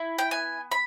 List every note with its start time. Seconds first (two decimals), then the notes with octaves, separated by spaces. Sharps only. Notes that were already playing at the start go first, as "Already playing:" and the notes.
Already playing: E4
0.18 G5
0.31 B3 G#5
0.72 B5